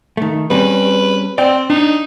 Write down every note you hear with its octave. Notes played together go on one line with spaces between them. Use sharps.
D#3 A3
G3 C4 C#4 B4
C4 D5 G5
D4 D#4